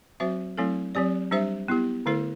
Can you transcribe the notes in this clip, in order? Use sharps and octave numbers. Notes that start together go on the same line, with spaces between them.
F#3 C4 F#4 C5 E5
F#3 A3 C4 E4 A4
F#3 C4 G4 D5
G3 D4 G4 C5 E5
B3 E4 G4
D3 A3 E4 A4 C5